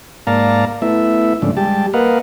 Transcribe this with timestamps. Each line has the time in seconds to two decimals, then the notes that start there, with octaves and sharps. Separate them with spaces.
0.27 G#2 A#3 D5 F5 A5 A#5
0.82 A3 B3 E4 E5
1.42 G#2 C#3 F3 A3 D4
1.57 G3 G#3 G4 A5
1.94 A#3 A#4 B4 D#5 F5 F#5